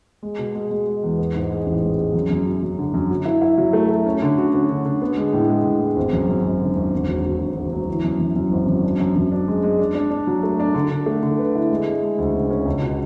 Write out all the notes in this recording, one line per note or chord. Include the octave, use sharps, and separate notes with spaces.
G#3
B2
G#3
G#3
G#3
E2
B3
G#2
G#3
A1
G#3
G#3
F#2
F#2
F#3
F#2
D3
F#2
F#3
E4
E4
F#3
A3
A3
C#4
D3
F#4
C#4
D3
D3
B3
G#3
A2
G#3
A2
G#3
G#1
F#2
F#2
G#1
D3
G#1
E1
F#3
F#3
E1
D2
F#3
E3
F#2
F#2
F#2
G#1
F#2
D4
F#2
F#2
D4
G#3
G#3
D4
D4
D4
F#3
A3
D4
D3
D3
A3
D3
B4
E4
G#3
G#3
G#3
D2
C#3
C#4
C#2
B2